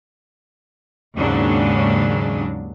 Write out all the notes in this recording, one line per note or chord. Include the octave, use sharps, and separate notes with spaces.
D#2 G#2 C#3 F#3 D4